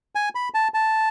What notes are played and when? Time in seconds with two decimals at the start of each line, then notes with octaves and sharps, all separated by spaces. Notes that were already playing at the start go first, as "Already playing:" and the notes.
0.15 G#5
0.35 B5
0.54 A5
0.74 A5